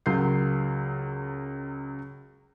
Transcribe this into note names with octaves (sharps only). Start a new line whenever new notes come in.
C#2 F#3 A#4 G6 C7